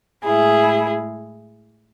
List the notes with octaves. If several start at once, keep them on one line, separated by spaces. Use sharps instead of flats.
A2 G#3 E4 G#4